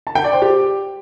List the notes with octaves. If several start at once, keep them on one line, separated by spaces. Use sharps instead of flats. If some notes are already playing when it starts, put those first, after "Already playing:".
A5
G5
D5
C5
G4